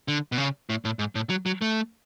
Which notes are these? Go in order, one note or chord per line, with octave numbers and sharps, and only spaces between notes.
D3
B2
C#3
A2
A2
G#2
A2
F#3
F#3
A3